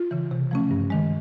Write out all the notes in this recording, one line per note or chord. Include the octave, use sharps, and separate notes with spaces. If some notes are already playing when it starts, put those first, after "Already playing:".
Already playing: F4
C#3 E3
C3
F3 A3 C#4
G2
D#3 G#3